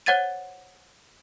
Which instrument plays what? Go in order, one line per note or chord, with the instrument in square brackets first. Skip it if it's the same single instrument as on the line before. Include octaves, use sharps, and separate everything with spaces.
[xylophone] C5 C#5 F#5 G#6 A6 D#7